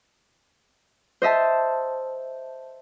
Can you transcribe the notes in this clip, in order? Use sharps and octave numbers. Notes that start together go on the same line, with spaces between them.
C5 D#5 E5 A5